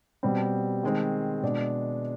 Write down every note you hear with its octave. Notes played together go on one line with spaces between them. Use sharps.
B2 G3 C4
D#3 G#3 C4
B2 G#3 D4